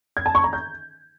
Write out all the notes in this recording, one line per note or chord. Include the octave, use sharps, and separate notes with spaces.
G#6
A5
C#6
A#5
G6